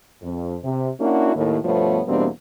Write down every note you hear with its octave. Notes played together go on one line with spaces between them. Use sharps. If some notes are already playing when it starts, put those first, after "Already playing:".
F2
C3
A#3 C#4 D4 E4 F#4
D#2 A2
G2 B2 F3 A3 B3 C#5
E2 B2 G3 A#3 C4 D4